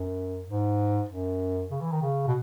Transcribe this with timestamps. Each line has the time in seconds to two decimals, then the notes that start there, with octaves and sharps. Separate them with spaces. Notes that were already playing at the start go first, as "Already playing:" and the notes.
Already playing: F#2
0.47 G#2
1.09 F#2
1.71 C#3
1.81 E3
1.92 D#3
2.02 C#3
2.27 B2